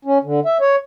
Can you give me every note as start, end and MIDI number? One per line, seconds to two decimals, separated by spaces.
0.05 0.18 61
0.24 0.40 50
0.45 0.58 76
0.61 0.76 73